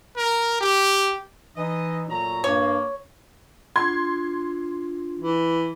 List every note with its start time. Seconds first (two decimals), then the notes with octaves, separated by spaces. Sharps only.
0.17 A#4
0.60 G4
1.56 E3 D#4 D#5
2.09 A#2 F#3 A3 A#5
2.44 G2 A#3 C#5
3.76 D4 F4 C6 G#6
5.19 E3